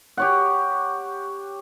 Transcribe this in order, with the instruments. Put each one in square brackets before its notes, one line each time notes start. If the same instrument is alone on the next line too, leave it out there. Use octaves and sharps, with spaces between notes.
[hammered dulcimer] G4 C#5 F#5